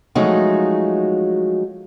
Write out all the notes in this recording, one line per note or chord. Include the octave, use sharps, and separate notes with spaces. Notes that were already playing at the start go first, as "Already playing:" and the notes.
F3 F#3 G#3 A3 D#4 F#4